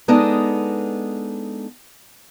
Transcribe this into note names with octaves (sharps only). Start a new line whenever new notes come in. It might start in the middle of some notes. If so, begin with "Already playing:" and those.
G#3 B3 D4 D#4 A4 D#5